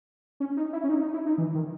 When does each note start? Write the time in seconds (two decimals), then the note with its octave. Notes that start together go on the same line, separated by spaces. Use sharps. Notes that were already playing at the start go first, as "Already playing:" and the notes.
0.40 C#4
0.57 D#4
0.73 E4
0.84 C#4
0.89 D#4
1.01 D#4
1.14 E4
1.26 D#4
1.38 E3
1.55 D#3